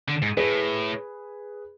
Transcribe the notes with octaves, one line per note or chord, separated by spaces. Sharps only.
D3
G#2
A2 G#4 B4